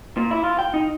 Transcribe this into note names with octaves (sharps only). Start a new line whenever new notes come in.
A#2
E4
F4
G5
D#4